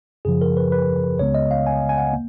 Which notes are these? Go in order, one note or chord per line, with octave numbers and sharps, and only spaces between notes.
F#2 C#3 F3 G#4
A#4
B4
B4
C#2 C#3 G#3 B3 C#5
D#5
F5
G#5
G#5
F#5
A#3